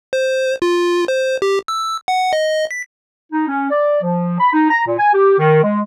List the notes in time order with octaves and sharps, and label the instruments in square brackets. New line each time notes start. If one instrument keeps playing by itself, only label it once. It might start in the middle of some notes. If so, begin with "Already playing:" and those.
[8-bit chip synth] C5
F4
C5
G4
E6
F#5
D#5
B6
[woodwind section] D#4
C#4
D5
F3
B5
D#4
A#5
A#2
G#5
G4
D#3
G#3